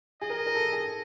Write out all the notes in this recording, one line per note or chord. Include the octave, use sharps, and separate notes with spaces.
G#4 D#5
A#4
A#4
A4
G#4